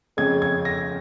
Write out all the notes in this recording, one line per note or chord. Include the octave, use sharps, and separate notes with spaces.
F2 C#3 G#3 C#4 G#6
G#6
A#6